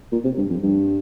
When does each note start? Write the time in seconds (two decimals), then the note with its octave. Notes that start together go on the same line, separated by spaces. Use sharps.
0.12 A#2
0.24 C3
0.37 G2
0.50 F2
0.63 G2